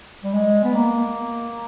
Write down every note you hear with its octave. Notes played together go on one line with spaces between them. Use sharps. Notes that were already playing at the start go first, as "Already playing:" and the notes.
G3
G#3
B3
A#3